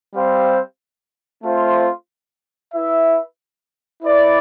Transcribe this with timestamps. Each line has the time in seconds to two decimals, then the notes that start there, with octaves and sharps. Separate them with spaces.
0.14 G3 C4 G4 C5 F5
1.43 A3 C4 F4 C5
2.74 E4 B4 E5
4.03 E4 B4 D5